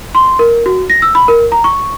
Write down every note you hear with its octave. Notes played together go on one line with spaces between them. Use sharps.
C6
A#4
F#4
A#6
E6
B5
A#4
A#5
C#6